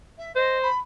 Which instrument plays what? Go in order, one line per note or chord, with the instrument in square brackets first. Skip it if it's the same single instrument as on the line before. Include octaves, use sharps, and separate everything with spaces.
[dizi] E5
[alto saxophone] C5 [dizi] D#5
[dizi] B5